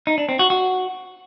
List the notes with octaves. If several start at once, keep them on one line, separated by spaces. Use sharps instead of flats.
D#4
D4
C4
F#4
F#4